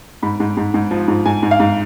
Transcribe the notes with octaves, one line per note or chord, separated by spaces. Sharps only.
G#2 B5
G#2
G#2
G#2
F3
G#2
G#2 G#5
G#2
F5
G#2